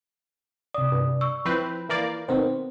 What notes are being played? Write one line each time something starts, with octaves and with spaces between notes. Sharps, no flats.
C3 D5 D#6
G2
C#6 E6
F3 C4 E4 B4 B5 G6
E3 A#3 D5
B2 D#3 C4 C5